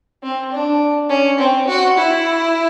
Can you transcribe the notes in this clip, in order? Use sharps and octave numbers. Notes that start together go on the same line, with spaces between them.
C4
D4
C#4
C4
F#4
E4